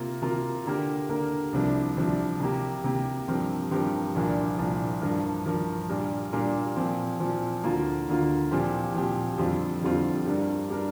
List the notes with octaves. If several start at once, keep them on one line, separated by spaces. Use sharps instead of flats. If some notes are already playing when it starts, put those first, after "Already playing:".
Already playing: C3 A#3 F4 A#4
C3 A#3 F4 A#4
D3 A#3 G4 A#4
D3 A#3 G4 A#4
C2 C3 F3 D4
C2 C3 F3 D4
C3 A#3 G4
C3 A#3 G4
G2 F3 C4 G4 A#4
G2 F3 C4 G4 A#4
C2 A#2 F3 D4 A#4
C2 A#2 F3 D4 A#4
G2 F3 D4 A#4
G2 F3 D4 A#4
A#2 G3 D4 A#4
A#2 G3 D4 A#4
A#2 F3 C4
A#2 F3 C4
D2 D3 A#3 F4
D2 D3 A#3 F4
A#2 F3 C4 G4
A#2 F3 C4 G4
F2 D3 G3 C4 F4
F2 D3 G3 C4 F4
G2 G3 D4 A#4
G3 D4 A#4